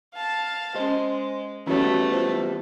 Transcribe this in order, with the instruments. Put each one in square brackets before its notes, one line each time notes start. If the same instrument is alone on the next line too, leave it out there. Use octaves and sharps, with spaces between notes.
[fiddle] F5 A5
[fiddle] G#3 [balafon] C#4 D#5 [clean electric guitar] C5
[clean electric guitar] E3 G3 B3 [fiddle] A3 B4 [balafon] C#4 F#4 C#5
[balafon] F4 C5